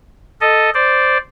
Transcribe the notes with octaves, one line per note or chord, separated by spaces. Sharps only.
A4 D#5
C5 D5